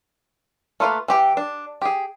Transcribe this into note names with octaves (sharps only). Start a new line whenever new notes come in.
A3 A#3 F4 B4 F5
E3 G4 G5
D4
G4 G#4